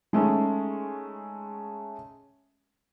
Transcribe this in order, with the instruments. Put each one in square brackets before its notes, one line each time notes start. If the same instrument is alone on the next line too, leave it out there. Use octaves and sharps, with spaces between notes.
[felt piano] G#3 A3 C#4 D#4